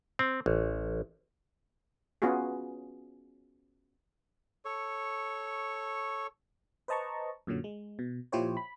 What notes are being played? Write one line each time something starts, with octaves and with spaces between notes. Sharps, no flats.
C4
A1
B3 C#4 F4 F#4 G#4
A4 C#5 C#6
B4 C5 D#5 A5 A#5 C#6
F#2 A#2 D3 F#3
G#3
B2
A#2 F3 E4 G4 C5 C#5
B5